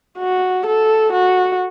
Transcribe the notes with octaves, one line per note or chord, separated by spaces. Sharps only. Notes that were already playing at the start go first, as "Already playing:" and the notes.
F#4
A4
F#4